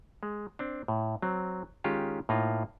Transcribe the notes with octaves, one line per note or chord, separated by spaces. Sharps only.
G#3
C4 D4
A2
F#3 C4
D#3 G#3 C#4 F4 G4
A2 A#3 D#4 F4